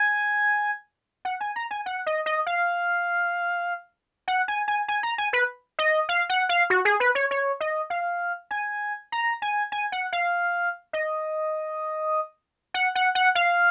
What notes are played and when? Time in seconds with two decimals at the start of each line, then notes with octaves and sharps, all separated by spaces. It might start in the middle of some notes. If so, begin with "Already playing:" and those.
Already playing: G#5
1.25 F#5
1.41 G#5
1.56 A#5
1.71 G#5
1.86 F#5
2.06 D#5
2.26 D#5
2.47 F5
4.28 F#5
4.48 G#5
4.68 G#5
4.88 G#5
5.03 A#5
5.18 G#5
5.33 B4
5.79 D#5
6.09 F5
6.29 F#5
6.49 F5
6.70 F#4
6.85 G#4
7.00 B4
7.15 C#5
7.31 C#5
7.60 D#5
7.90 F5
8.51 G#5
9.12 A#5
9.42 G#5
9.72 G#5
9.92 F#5
10.12 F5
10.93 D#5
12.74 F#5
12.95 F#5
13.15 F#5
13.35 F5